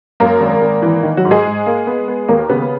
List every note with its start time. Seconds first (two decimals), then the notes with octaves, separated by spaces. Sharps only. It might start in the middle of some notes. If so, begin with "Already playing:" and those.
0.20 F#2 A#3 A#4
0.41 G#1
0.62 G#1
0.82 E3
1.03 D#3
1.17 F#3 F#4
1.25 G#2
1.31 G#3 G#4
1.45 G#2
1.66 A#3
1.87 B3
2.08 B3
2.28 D#2 A#3 A#4
2.49 C#3 B3 B4